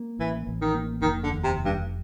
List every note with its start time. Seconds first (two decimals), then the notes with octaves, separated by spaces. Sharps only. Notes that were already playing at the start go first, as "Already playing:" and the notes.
Already playing: A#3
0.19 A1 E3
0.47 A1
0.61 D#3
0.75 A#3
1.02 F1 D#3
1.23 D3
1.31 D#2
1.44 C3
1.58 F1
1.65 G2